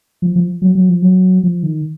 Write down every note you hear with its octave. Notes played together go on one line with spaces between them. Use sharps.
F3
F3
F#3
F#3
F3
F#3
F3
D#3